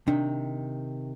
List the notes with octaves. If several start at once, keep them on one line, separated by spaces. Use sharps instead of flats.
C3 D#3 D4